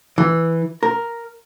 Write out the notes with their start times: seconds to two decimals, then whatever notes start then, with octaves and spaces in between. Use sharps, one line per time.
0.18 E3
0.83 A#4